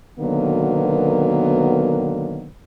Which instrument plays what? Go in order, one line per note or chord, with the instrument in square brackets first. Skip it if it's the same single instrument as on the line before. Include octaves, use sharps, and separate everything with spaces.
[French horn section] B2 D3 D#3 F#3 A#3 B3